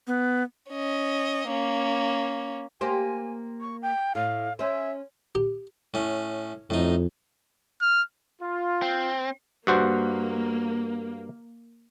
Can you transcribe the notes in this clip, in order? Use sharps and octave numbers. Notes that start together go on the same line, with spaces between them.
B3
C#4 D#5
A#3 C#4
A#3 G4 C5 G#5
C#6
G5
A2 F5
C#4 C5 E5
G4
A2 C#4
F2 A2 D#4
F6
F4
C4
G2 A#3 F#4 C5